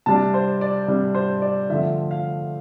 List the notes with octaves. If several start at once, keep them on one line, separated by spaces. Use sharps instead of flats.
C3 G3 D4 A5
C5
D5
C3 G3 D4
C5
D5
D3 F3 A3 C4 E5
F5